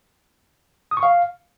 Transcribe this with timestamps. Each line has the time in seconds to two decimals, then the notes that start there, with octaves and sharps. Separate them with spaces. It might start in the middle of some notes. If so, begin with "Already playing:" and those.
0.91 D#6
0.97 C#6
1.03 F5